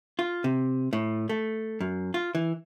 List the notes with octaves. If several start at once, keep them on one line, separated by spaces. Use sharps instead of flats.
F4
C3
A2
A3
F#2
F4
E3